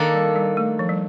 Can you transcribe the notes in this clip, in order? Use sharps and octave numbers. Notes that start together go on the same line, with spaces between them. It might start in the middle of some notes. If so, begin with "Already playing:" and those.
Already playing: D#3 A#3 D4 A4
G3
G3
A3
F3
G3